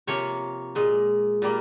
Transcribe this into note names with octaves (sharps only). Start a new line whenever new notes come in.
C3 F3 A#3 C#5
A#2 G#3
A#2 G3 A#3